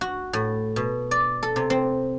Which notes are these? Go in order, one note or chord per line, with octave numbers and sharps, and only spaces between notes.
F#4
A2
B2
D5
A4
C3
C4